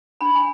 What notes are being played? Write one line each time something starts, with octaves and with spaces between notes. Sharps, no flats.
D4 B5
G#5